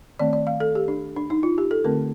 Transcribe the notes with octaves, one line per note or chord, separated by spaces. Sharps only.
D#3 A3 C4 D5
D5
F5
A4
G4
D4
D4
D#4
F4
G4
A4
D3 A3 C4 A#4